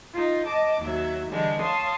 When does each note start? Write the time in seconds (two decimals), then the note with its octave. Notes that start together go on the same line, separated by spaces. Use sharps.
0.13 D#4 F4
0.46 D#5 A5 D6
0.81 D#2 F#3 E5
1.30 D3 E3 G3 G#3 D4
1.61 C#5 F5 A5 C6 D#6